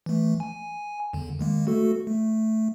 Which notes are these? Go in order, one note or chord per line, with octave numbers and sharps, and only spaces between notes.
E3 A3
G#5
E2 D3
D#3 G#3 A#3
A3 F#4 A4
A3